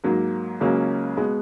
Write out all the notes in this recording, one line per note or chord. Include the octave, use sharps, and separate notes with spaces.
G#2 F#3 A#3
C#2 C#3 F#3 A#3 C#4
B2 G#3 B3